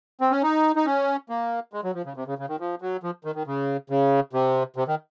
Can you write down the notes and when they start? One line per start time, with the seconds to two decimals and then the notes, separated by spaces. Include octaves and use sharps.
0.21 C4
0.31 C#4
0.43 D#4
0.76 D#4
0.86 C#4
1.29 A#3
1.73 G#3
1.84 F#3
1.95 F3
2.05 C#3
2.16 C3
2.27 C#3
2.38 C#3
2.49 D#3
2.60 F3
2.82 F#3
3.03 F3
3.25 D#3
3.35 D#3
3.47 C#3
3.90 C#3
4.33 C3
4.76 C3
4.88 D#3